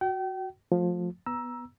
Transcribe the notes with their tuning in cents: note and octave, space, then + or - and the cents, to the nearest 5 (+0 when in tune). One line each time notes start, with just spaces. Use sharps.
F#4 +0 G5 -35
F3 +20 A3 +0
B3 +0 A#5 +20 E6 +0